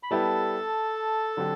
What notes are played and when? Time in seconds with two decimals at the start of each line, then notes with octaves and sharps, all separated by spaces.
0.03 B5
0.11 G3 B3 E4 G4 A4 A5
1.37 D3 F#3 C4 G4